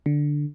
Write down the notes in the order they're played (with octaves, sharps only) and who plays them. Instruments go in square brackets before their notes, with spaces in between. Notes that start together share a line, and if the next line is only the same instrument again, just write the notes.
[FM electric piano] D3